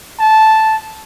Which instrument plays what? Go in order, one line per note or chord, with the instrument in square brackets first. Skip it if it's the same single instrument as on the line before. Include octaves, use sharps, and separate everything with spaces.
[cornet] A5